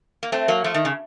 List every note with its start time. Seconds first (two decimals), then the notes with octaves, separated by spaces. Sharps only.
0.23 A#3
0.32 A3 C4
0.48 F#3 A#3
0.64 F3 A3
0.74 D#3
0.85 C#3